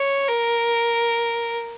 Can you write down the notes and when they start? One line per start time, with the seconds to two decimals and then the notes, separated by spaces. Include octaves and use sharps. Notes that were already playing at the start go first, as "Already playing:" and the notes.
Already playing: C#5
0.28 A#4